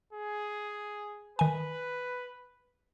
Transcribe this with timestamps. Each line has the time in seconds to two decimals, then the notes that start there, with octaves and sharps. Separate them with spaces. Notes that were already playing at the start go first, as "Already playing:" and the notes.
0.13 G#4
1.39 D#3 B4 G#5